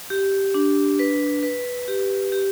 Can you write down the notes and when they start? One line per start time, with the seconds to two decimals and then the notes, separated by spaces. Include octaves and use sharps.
0.10 G4
0.54 D4
0.99 B4
1.43 B4
1.88 G4
2.32 G4